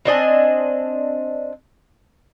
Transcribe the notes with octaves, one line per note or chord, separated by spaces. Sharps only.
C4 D4 D#5 G#5